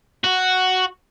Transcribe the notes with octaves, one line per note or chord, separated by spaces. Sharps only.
F#4